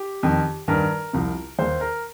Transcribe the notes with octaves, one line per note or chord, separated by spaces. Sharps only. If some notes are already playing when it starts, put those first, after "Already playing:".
Already playing: G4
F2 D#3
G2 D#3 A#4
C2 C3 F3
D#2 D#3 C5
A#4